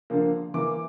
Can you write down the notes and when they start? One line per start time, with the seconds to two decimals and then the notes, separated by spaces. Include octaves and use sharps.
0.10 D3 F3 A#3
0.54 E3 A#3 D6